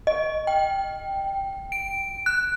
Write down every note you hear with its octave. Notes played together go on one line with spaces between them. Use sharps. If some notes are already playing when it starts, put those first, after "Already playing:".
D#5
G5
D7
F#6